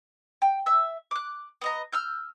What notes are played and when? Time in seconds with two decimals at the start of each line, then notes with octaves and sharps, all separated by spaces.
0.42 G5
0.66 E5 E6
1.11 D6 F#6
1.61 B3 D#5 A#5
1.92 E6 F6 G6